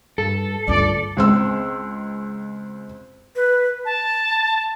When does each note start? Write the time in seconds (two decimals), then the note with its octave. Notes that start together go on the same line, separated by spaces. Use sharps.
0.18 G2 A4
0.68 D2 G2 F4 D5
1.17 C#2 C4 E6
3.36 B4
3.85 A5